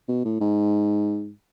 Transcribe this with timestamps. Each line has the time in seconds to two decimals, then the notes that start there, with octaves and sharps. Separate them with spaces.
0.08 B2
0.25 A2
0.40 G#2